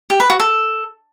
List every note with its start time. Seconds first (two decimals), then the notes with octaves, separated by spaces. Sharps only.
0.10 G4
0.20 B4
0.30 F#4
0.40 A4